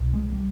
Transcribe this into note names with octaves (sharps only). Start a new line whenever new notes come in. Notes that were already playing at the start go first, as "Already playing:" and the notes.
Already playing: C2 B2
G#3
G3